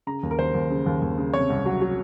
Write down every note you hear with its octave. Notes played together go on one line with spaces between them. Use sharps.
C#3 A#5
D#2
A#4
D#2 C5
D#2
C#3
D#2
D#2
C#3
C3 C#5
C2
F#3
F#3